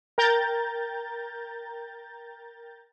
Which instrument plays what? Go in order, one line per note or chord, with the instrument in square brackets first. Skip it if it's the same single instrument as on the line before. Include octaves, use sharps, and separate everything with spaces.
[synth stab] A#4 G5 A#5 G6 A6